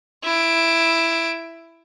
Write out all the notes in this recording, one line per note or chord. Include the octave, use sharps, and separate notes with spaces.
E4 D7